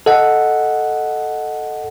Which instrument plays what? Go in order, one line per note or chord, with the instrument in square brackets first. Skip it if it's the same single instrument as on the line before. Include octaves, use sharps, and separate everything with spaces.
[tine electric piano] A4 D#5 F#5